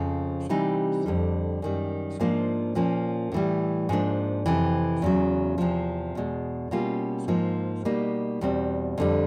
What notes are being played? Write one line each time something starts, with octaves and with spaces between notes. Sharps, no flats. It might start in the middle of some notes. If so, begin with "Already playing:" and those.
Already playing: F2 C#3 F3
C3 E3 G3 C4 D#4
F2 D3 G3
F#2 D#3 G3
G#2 F3 A#3 D4 F4
A#2 F3 A#3 C#4
A2 E3 G3
G#2 F3 A#3 D4
F2 C3 E3
E2 C#3 F#3
E2 C3 F3
E2 B2 G#3
B2 G3 A#3 C#4 F4
G#2 F3 A#3 D#4
B2 G3 A#3 D#4
E2 B2 G3 C4
F2 D3 G3